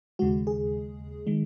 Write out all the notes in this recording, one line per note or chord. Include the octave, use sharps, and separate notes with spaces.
D#2 C#3 G#3 F#4
G#4
D#3 G#3